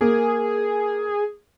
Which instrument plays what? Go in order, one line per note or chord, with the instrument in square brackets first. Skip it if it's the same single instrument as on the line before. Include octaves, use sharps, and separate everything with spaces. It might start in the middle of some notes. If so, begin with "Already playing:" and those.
[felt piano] A#3 [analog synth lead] G#4